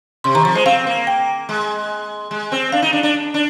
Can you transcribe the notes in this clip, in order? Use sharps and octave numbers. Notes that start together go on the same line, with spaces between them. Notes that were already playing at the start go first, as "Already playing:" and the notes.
C3 C6
D#3 A#5
F3 A#5
G#3 C5
C4 F5
A#3
G5
G#3
G#3
C4
D4 F5
D#4
D4
D4
D4